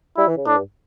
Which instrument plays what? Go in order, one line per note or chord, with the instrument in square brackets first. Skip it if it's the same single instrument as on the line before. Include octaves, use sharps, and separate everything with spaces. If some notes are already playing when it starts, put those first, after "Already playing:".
[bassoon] G3 [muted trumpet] E4
[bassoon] E3
C#3
[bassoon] A2 [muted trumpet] D4
[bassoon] G2